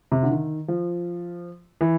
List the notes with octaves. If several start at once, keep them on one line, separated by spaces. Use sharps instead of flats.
C3
D3
D#3
F3
E3